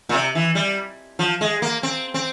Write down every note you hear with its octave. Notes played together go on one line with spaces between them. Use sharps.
A#2
C3
E3
G3
F3
G#3
A#3
C4
C4